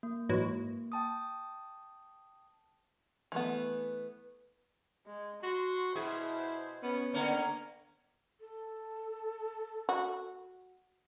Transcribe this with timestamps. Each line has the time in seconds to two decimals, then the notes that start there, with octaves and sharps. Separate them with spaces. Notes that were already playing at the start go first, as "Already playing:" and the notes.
0.03 A#3
0.29 G#2 E3 F#3
0.92 G5 A5 D#6
3.32 E3 A3 B3
5.06 G#3
5.43 F#4 C6
5.96 B2 E4 G#4 C5
6.83 B3 C#4
7.14 D3 A#3 C#4
8.41 A4
9.89 F#4